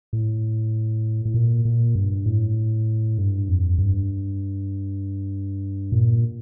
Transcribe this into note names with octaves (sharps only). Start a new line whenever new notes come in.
A2
A2
A#2
A#2
G2
A2
G2
F2
G2
A#2